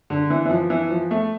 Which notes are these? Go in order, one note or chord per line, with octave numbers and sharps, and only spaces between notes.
D3
E3
E3
F3
E3
F3
A3